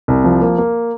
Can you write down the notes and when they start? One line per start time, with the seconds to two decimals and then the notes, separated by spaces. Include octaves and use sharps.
0.08 C2
0.24 F3
0.41 A#3
0.58 A#3